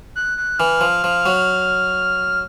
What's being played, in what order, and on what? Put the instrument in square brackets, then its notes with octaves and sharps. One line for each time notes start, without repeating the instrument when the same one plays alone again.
[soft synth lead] F#6
F#6
[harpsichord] E3 [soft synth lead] F6
[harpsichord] F3
F3
F#3